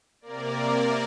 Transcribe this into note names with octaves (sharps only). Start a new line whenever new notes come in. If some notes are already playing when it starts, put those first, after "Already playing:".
C3 A#3 A#4 D5